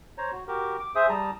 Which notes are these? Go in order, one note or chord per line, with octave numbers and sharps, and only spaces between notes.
C5 C#5 A#5
F#4
F#4 G4 A#4
D6
G#4 C5 E5 D#6
G3 A5 A#5 D#6